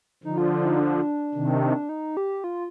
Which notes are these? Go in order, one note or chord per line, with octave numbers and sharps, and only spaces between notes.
D3 F3 D#4
F4
F4
D#4
D4
C3 D#3
D#4
G4
F4